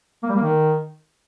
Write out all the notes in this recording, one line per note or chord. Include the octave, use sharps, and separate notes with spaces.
A#3
G3
A#3
D#3